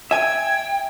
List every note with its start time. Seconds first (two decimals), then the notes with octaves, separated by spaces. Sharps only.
0.11 E5 G5 G#5 G#6